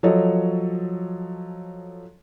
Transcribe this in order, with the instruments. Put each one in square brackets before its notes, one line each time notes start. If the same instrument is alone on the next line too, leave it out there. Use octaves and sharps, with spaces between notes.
[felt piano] F3 F#3 A4 C#5 D#5